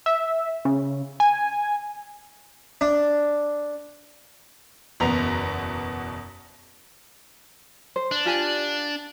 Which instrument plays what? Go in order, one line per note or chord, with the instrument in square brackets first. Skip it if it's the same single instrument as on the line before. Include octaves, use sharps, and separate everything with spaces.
[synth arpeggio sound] E5
C#3
G#5
[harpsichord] D4
[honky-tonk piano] F#1 E2 B2 B3 A#5 F7
[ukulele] C5
[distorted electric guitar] D4
[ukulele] F4 G4 G#5